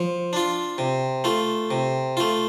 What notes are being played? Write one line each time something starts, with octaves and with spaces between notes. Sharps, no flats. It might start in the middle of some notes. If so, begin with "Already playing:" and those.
Already playing: F3
D4 F4
C3
A3 F4
C3
A3 F4